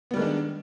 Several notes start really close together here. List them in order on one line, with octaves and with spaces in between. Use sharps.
B3 G3 D#3 G#3 D4